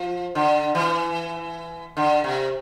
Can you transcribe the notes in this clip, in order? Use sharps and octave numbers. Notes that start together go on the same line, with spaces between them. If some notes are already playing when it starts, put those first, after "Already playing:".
Already playing: F3
D3
E3
D3
C3